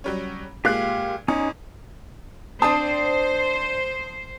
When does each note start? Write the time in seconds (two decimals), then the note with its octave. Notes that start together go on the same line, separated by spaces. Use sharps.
0.04 F#3 G3 C#4
0.65 A#2 G#3 G4 F5 F#6
1.28 E2 C#4 D#4
2.62 C4 D4 C5 A5 D#6